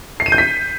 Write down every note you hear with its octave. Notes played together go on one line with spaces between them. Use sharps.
C7
D#7
G6
B6